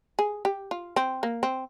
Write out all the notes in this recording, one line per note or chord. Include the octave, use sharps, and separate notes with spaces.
G#4
G4
F4
C4
A#3
C4